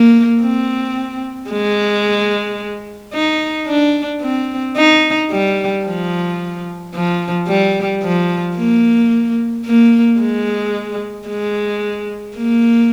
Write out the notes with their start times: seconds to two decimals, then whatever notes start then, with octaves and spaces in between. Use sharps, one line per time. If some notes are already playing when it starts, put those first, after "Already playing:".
Already playing: A#3
0.41 C4
1.50 G#3
3.13 D#4
3.67 D4
4.22 C4
4.77 D#4
5.31 G3
5.85 F3
6.94 F3
7.48 G3
8.03 F3
8.57 A#3
9.65 A#3
10.20 G#3
11.28 G#3
12.37 A#3